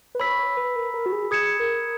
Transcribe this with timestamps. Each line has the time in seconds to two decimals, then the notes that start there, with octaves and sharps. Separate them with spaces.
0.15 B4
0.20 C#5 B5 E6 B6
0.39 C#5
0.57 B4
0.76 A#4
0.94 A#4
1.06 F#4
1.12 G#4
1.31 G#4 D#6 G#6 C#7 E7
1.60 A#4